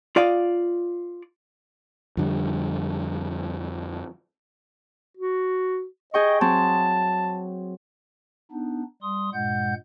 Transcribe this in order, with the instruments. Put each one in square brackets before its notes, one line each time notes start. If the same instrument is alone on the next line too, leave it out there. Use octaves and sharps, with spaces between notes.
[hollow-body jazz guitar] F4 D5 D#5 F5
[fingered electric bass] F2 D3 G3
[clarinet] F#4
[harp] G#4 G5 C#6 [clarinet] D#5
[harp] F#3 C4 [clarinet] A5
[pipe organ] B3 D4 D#4
G3 C6 D#6
G2 A#2 G#3 F#5 G6